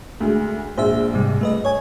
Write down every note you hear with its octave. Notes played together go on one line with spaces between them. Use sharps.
D2 G#3
A#1 G#3 C5 E5
G#2 C3 G3
A3 B4 D#5
C#5 G#5